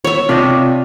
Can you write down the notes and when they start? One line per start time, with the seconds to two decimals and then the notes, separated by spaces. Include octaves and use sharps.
0.04 C#5 E5
0.29 C3 D4 F4 G4 D#5